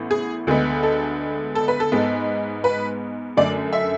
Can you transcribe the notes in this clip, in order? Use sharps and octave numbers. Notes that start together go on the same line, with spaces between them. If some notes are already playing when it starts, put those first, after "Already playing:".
Already playing: A1 A2 E3 B3
G#4
D2 D3 G#3 B3
A4
A4
B4
A4
G#2 G#3 B3
B4
F#2 D3 A3 D5
E5